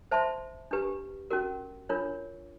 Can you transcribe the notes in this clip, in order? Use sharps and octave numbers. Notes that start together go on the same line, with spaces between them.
C5 E5 A5 C6
D4 G4 B4
C#4 F#4 A#4
D4 F4 A#4 C#5